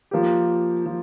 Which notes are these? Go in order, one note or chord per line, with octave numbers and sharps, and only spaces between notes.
F3 A#3 G4
F3